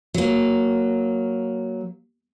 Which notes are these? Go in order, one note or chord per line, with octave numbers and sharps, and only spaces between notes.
F#3 A#3